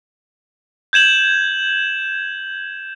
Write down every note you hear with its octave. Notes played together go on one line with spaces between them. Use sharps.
G6 G#6 E7 F#7